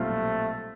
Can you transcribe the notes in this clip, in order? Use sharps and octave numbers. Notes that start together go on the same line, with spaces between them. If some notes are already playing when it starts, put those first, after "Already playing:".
Already playing: B1 A#2 G3 A3 C4 F4